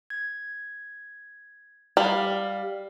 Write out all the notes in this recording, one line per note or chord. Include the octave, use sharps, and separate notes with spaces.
G#6
G3 G4 F5